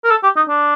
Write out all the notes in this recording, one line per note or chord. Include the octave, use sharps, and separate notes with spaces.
A#4
A4
G4
D#4
D4